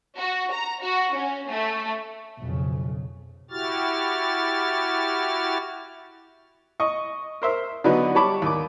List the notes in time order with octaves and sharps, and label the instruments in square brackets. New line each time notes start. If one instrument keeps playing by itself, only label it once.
[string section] F#4
A#5
F#4
C#4
A3
[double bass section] B1 F2 C#3
[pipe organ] E4 F#4 G4 F6 A6
[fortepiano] D#5 C#6
A#4 C5 E5
D3 F#3 B3 D4 D#4 F#4
G3 C#5 A5 B5 D6
D#2 D6